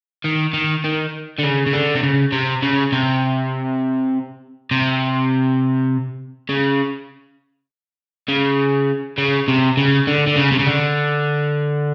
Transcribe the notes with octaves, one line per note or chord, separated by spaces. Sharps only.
D#3
D#3
D#3
D3
C#3
C#3
D3
C3
C#3
C3
C#3
C3
C3
C#3
C#3
C#3
C3
C#3
D3
D3
C#3
C3
C#3
D3